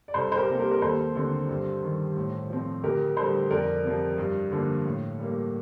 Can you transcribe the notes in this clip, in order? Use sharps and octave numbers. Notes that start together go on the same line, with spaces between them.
D5
C2 A4 C5
C5
G4 A#4
C3 G3 A#3
G4 A#4
A#4
D#2 A4 C5
D3 A3 C4
G2
D#3 G3
A2
F3 C4
D2 G4 A#4
D3 G3 A4 C5
F2 A#4 D5
C3 F3
G2
D3 F3 A#3
A2
G3 A#3